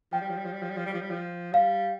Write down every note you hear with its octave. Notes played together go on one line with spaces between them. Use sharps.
F3 G5
G3
F3
G3
F3
G3
F3
G3
F3
G3
F3
G3
F3
G3 F5